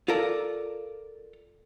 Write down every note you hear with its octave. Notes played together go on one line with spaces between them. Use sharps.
F4 A4 A#4 D5